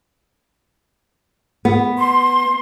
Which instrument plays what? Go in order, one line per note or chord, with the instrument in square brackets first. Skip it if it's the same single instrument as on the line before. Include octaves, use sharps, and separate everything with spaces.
[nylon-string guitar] B3
[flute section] C6